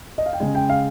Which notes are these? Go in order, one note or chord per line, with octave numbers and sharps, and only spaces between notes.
D#5
F5
G5
C#3 G#3 G#5
G5
F5